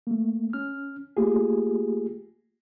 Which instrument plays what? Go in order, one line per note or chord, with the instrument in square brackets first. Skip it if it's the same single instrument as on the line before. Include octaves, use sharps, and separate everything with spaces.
[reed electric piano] A3 A#3
C#4 F6
A3 A#3 F4 G4 G#4